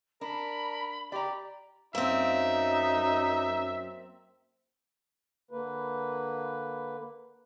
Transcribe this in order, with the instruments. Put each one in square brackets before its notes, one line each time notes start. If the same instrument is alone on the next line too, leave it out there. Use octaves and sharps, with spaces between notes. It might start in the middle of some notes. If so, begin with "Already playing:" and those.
[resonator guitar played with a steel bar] D4 [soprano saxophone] A#4 [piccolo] B5
[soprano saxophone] G4 [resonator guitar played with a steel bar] D5 A#5
[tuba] F#2 [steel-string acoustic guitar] A#3 C4 [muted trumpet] D#4 [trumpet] E5
[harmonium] D3 A#3 B4